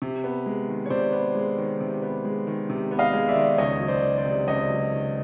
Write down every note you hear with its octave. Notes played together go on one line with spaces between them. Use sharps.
C3
B3
G#3
D#3
C#5
C3 C5 D5
B3
G#3
D#3
C3
B3
G#3
D#3
C3
B3
D#5 F5
G#3
D5 E5
D#3
C#2 C#5 D#5
F#3
C5 D5
D#3
C5 D5
C3
C#2 C#5 D#5
F#3
D#3